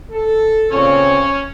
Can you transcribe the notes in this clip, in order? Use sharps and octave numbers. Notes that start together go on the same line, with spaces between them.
A4
A#2 C#3 C4 C#4 C#5